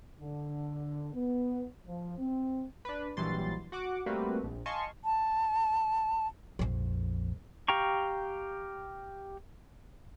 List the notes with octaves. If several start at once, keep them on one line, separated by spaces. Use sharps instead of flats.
D3
B3
F3
C4
D4 B4
A#1 E3 F#3 G3 C6 A6
F#4 F#5 D6
G3 A3 A#3 C4 F#4 B4
A#1
D#5 F5 G#5 A5 C6 C#6
A5
A#1 F2
G4 F5 G5 A#5 C#6